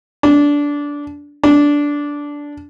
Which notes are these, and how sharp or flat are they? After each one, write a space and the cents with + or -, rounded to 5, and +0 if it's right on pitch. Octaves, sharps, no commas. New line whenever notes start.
D4 -15
D4 -10